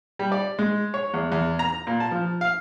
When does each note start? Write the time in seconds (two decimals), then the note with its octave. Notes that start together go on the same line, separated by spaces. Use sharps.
0.19 G3
0.32 D5
0.59 G#3
0.94 C#5
1.14 E2
1.32 E2
1.59 A#5
1.87 A#2
2.00 A5
2.11 F3
2.41 F5